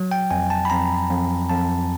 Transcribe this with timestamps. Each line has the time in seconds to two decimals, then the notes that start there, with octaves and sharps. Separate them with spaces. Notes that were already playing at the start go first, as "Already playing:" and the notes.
Already playing: F#3
0.11 G5
0.31 F2 G#5
0.50 A5
0.65 B5
0.70 F2 A#5
1.10 F2
1.49 F2 A5